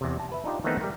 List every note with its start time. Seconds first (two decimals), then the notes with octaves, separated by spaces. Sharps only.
0.01 E2 C3
0.20 A5
0.32 B4 E5
0.44 D4 D#4 F4 G4
0.64 D#3 E3 A3 B3 C4 D#4
0.81 G3 A#4